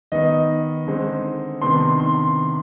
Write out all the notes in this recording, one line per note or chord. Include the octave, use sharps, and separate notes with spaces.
D#3 B3 D#4 D#5
D3 G#3 C4 D#4
C3 D#3 B3 D4 C6
C6